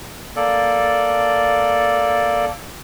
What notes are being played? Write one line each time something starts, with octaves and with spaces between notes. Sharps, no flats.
A#3 A4 D5